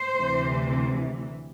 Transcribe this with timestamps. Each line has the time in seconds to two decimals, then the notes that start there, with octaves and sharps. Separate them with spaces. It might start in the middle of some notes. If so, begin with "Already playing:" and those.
Already playing: C5
0.17 D2 C3 E3